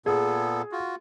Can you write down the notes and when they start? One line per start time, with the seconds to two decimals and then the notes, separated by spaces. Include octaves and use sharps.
0.06 A#2 B3 G#4 A4
0.72 F4 F#4